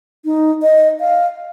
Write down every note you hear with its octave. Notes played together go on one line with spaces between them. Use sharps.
D#4
D#5
F5